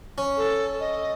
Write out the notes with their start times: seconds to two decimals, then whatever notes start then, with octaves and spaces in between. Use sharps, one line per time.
0.18 C#4
0.37 A4
0.80 D#5